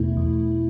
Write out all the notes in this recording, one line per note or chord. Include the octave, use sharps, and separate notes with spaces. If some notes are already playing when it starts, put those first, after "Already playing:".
Already playing: E2 B2 A3 E4
E2